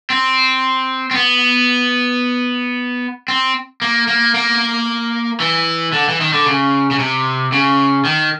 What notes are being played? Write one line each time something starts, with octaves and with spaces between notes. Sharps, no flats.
C4
C4
B3
C4
A#3
A#3
A#3
E3
D3
E3
D#3
D3
C#3
C#3
C3
C#3
D#3